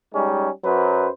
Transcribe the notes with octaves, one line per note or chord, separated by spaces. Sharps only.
G3 G#3 C#4 D#4
F#2 F#3 B4 C5